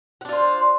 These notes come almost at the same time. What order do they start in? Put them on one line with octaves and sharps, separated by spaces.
F#5 D4 F4 C5